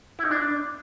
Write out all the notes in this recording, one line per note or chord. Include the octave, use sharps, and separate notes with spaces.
E4
D#4
D4